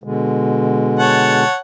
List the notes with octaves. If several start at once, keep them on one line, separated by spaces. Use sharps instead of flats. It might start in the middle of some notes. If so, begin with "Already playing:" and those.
B2 D3 G#3
C#5 F#5 A5